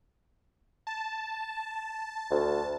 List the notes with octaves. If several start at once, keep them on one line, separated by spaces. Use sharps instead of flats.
A5
D2